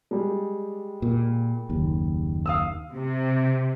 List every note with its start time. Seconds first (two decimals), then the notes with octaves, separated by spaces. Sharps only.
0.11 G3 G#3
1.02 A#2
1.69 F#1 D#2
2.46 F5 D#6 E6
2.93 C3